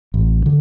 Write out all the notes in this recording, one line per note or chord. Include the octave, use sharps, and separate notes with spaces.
A1
D3